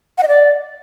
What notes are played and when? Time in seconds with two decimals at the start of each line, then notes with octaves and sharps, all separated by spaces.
0.18 F#5
0.23 D#5
0.28 D5